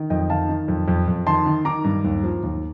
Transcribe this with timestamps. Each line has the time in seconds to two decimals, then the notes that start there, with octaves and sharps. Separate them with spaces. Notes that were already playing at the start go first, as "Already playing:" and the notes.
Already playing: D#3
0.10 F2 D#5 G5
0.30 D#3 F5 A5
0.49 D#3
0.68 F2
0.88 F2
1.08 F2
1.27 D#3 A5 C6
1.46 D#3
1.65 D#3 A#5 D6
1.84 G2
2.04 D#2
2.23 F3
2.43 D#2